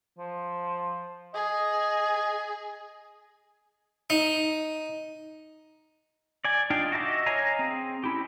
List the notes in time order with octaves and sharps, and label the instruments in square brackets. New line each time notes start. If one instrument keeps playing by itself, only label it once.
[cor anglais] F3
[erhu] G#4 [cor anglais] D#5
[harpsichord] D#4
[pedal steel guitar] D5 G#5
D4 D#4 F4 F5 G5
F#4 D#5 E5 A5 D6
C#5 D#5 F5 G#5 A#5
C4 G#4
C#4 E4 G4